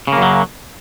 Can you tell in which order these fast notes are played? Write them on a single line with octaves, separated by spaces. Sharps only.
C#3 A#3 F#2 F#3